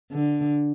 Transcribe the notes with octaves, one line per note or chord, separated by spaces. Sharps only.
D3